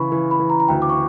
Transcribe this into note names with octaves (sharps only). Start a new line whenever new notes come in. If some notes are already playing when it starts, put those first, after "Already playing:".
Already playing: C#3 E3 B5 C#6
E3
B5
E3
A#5
A#5
D2 G5
D6
C#6